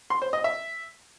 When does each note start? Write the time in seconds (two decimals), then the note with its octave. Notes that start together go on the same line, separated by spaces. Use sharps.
0.10 C6
0.22 C5
0.33 D#5
0.44 E5